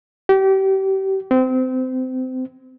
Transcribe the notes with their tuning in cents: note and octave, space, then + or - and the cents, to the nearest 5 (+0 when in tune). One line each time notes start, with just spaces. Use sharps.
G4 -30
C4 -25